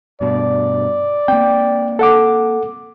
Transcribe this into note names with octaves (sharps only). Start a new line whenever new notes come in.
G2 B2 D5
A#3 C4 G5
A4 F#5 D6